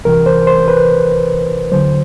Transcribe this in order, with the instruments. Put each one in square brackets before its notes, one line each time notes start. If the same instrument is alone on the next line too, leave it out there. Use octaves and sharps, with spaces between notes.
[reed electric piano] C2 C3 E3 A#4
C5
C5
B4
D#2 D3 F#3 C5